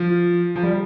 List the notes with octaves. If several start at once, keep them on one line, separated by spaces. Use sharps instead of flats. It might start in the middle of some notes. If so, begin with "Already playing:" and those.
Already playing: F3
F3
G3